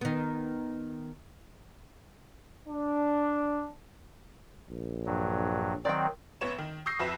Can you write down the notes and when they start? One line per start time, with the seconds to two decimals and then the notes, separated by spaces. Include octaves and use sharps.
0.01 D#3 B3
2.69 D4
4.70 A#1
5.06 G2 F#3
5.85 D#3 F#3 C4 D5 G5
6.41 A1 B3 C#5 E7
6.58 D#3
6.86 C#6 D#6 E6 G6 A#6 C7
6.99 F2 F#4 B4 E5 E7